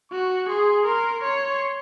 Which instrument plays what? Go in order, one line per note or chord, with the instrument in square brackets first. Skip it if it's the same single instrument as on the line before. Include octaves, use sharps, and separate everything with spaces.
[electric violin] F#4 [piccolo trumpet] C#6
[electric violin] G#4 [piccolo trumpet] C6
[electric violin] A#4 [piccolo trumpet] C6
[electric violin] C#5 [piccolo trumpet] C6